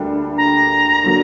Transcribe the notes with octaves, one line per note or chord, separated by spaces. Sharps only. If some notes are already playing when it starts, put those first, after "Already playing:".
Already playing: D2 D3 G3 A#3 D4
A#5
D3 F#3 A#3